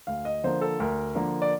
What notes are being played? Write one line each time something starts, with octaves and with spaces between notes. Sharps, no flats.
D2 F5
D#5
D3 F3 A#3 C5
A4
D2 A#4
D3 F3 A#3
D5